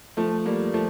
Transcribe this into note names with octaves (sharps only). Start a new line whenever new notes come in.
F3 A3
G3 A#3
F3 A3